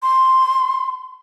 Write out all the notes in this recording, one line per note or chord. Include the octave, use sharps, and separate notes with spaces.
C6